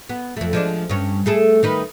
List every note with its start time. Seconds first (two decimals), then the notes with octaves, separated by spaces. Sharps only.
0.09 B3
0.37 F2 A3
0.53 F3 G#3 D4
0.89 G2 C#4
1.26 A3 G#4 A4
1.63 D#3 D#4 B4